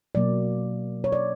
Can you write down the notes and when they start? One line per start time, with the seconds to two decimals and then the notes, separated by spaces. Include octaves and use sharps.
0.15 B2 F#3 A#3 D5
1.04 C#5
1.12 D5